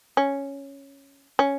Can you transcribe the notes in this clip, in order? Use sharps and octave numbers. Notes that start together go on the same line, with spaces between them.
C#4
C#4